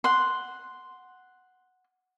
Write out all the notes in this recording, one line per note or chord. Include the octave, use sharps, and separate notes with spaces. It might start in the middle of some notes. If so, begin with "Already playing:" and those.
F#5 C6